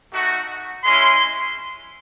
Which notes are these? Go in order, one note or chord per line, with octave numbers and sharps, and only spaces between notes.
A3 D#4 F#4
G#3 C#4 E4 C6